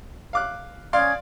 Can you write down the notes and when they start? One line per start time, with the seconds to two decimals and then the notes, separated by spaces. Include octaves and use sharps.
0.33 F5 D6 F#6
0.93 C#4 D5 F5 C6 D#6 G#6